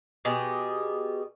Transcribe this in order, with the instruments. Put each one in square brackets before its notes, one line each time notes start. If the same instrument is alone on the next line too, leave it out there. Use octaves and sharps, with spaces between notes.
[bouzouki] B2 G4 G#4